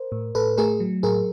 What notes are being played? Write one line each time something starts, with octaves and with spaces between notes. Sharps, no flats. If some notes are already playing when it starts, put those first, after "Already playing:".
Already playing: A#4 C5
A2
A2 A4 B4
A3 G#4 A#4
F#3
A2 G#4 A#4